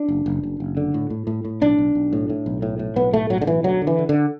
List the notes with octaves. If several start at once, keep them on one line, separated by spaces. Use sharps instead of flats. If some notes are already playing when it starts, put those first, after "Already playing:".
Already playing: D4
F#1
F#1
F#1
F#1
D3
A2
A2
A2
A2
B1 D4
B1
B1
A2
A2
B1
A2
A2
B1 B3
A2 A3
B1 F#3
D3
B1 E3
D2 F#3
D3
E3
D3
D3